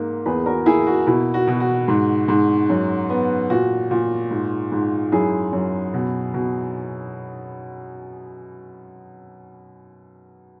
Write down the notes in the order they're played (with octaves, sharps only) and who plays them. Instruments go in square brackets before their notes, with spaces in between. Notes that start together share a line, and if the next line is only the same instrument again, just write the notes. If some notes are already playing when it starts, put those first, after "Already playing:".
Already playing: [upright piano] G#2 A#3
E2 G#4 B4
F#4 A#4
A#3 E4 G#4
F#4
B2 E4
F#4
B2
F#4
G#2
G#2
F#2
B3
A#2 F#4
A#2
G#2
G#2
F#2 E4 G#4
F#2
B2
B2